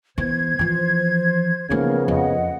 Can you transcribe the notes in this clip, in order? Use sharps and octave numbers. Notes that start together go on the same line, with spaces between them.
E3 B3 C5 G#6
E3 F3
C#3 F3 A#3 B3 D#4 A#4
F2 D#5 F#5